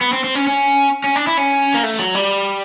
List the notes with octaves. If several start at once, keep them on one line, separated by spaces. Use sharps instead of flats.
B3
C4
C4
C#4
C#4
C#4
D4
E4
C#4
A#3
A3
F#3
G3